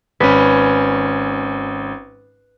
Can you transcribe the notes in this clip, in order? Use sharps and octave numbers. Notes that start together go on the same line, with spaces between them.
G#1 C#4 B4